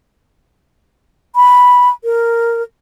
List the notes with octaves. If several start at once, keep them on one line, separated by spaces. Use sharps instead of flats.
B5
A#4